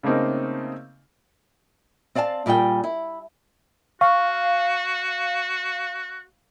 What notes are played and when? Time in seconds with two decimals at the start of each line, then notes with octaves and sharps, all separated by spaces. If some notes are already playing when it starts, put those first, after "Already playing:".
0.03 C#3 A3 A#3 C4 D#4
2.15 C4 D5 F5 G#5 A5
2.46 A#2 G3 G#4 C#5 G5
2.84 E4
4.01 F#4 F5 C#6